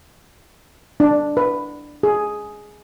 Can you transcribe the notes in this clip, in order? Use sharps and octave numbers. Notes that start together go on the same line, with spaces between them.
D4
B4
G#4